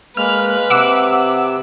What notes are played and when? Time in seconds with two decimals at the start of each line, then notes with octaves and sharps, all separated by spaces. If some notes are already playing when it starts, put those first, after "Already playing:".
0.17 G#3 A#3 B4 F6
0.70 C3 F#5 D6 E6